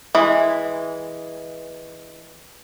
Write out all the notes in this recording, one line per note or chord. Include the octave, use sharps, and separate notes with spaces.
E3 G#3